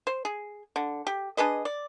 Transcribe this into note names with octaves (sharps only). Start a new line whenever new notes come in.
C5
G#4
D3
G4
D4 G#4 B4 D#5
D5